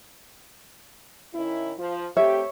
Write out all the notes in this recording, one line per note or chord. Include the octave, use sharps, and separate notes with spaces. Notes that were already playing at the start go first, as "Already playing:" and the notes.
D#3 C#4 E4
F3
A3 C4 G4 C#5 E5